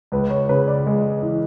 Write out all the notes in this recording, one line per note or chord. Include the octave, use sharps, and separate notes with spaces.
C#2 B4
C#5
C#3 B4
D5
G#3
E3